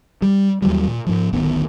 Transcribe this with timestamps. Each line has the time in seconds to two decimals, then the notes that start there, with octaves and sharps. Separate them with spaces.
0.22 G3
0.62 D#2 E3 F#3 G3
0.88 A#2
1.07 G#2 F3
1.33 D1 A1 D#3 B3